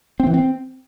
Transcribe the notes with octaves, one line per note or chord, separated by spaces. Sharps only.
C4
E3
C4